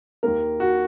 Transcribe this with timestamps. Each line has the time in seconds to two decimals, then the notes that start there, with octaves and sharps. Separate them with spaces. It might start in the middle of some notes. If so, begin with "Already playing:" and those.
0.23 D#2 D#3 A#3 A#4
0.60 F#4